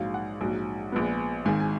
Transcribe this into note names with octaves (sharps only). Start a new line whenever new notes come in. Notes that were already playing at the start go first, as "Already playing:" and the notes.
Already playing: A#1 G#2 F#3 F5
F#5
A#1 G#2 F#3
A#1 A#2 G#3 B3
G#1 G#2 D#3 G#5
G#5